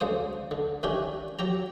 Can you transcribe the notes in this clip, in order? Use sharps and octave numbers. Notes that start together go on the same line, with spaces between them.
D2 C#3 C5 D#6
D3
D#3 C#4 D4 E4 G4
F#3 G4 A#5